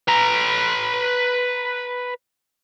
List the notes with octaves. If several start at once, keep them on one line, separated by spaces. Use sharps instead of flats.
B4 A#5